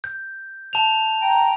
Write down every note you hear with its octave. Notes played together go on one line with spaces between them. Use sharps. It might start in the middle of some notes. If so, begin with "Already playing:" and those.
G6
A5 F7
G5 A#5